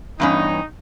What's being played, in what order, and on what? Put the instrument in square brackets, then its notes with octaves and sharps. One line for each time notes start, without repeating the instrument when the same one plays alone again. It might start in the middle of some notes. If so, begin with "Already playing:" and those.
[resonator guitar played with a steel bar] E2 G2 C#4 [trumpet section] D#4